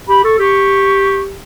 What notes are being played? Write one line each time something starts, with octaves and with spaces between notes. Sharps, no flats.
G4 B5
A4 C#6
G4 C#6